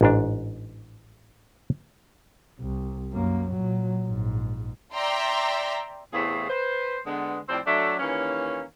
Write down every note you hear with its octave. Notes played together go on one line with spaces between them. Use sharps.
A1 G#2 D4
C2
F#2 A#3
A#2 F#3
A#1 G#2
D5 E5 G5 A#5 C6
E2 A2 C3 A3 G#4 F5
B4 C5
D3 G#3 B3
F2 A2 C3 C4 C5 D5
F#3 A3 D4
D#2 E3 A#3 C#4